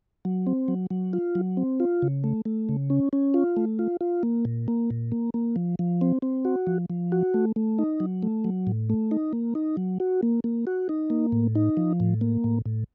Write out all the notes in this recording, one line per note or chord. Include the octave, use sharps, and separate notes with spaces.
F#3
C4
F#3
F#3
F4
F#3
C4
F4
C#3
A3
A3
C#3
C#4
C#4
F4
A3
F4
F4
A#3
A#2
A#3
A#2
A#3
A#3
F3
F3
C4
C4
F#4
F3
F3
F#4
A3
A3
D#4
F#3
A3
F#3
A2
A3
D#4
A#3
D#4
F#3
F#4
A#3
A#3
F#4
D#4
A#3
A2
D#4
F3
A2
A#3
A2
A2